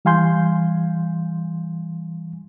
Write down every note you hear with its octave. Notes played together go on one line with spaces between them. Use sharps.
E3 G3 F5 G#5 C6 G6